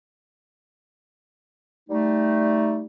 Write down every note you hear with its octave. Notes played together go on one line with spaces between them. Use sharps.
G3 A3 D#4